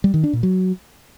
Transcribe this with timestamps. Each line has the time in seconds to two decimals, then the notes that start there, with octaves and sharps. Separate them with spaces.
0.04 G3
0.14 D#3
0.24 D4
0.33 A#2
0.43 F#3